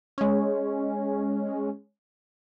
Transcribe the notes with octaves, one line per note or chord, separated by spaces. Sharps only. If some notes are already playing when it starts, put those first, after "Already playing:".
G#3 C#4